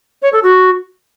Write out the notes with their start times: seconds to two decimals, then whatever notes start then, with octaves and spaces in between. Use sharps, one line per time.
0.22 C#5
0.32 A4
0.43 F#4